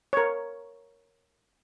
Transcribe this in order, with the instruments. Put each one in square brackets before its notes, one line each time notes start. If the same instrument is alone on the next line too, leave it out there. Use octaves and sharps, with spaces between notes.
[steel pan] A#4 C#5